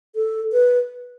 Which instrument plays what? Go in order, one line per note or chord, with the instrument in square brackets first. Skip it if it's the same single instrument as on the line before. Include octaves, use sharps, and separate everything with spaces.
[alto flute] A4
B4